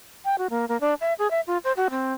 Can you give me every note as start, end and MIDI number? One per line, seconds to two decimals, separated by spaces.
0.25 0.35 79
0.38 0.47 66
0.50 0.68 58
0.68 0.80 58
0.81 0.94 62
1.01 1.13 76
1.19 1.30 68
1.31 1.41 76
1.47 1.58 65
1.64 1.72 72
1.77 1.88 66
1.90 2.13 60